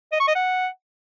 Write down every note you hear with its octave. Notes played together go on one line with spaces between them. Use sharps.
D#5
C#6
D#5
F#5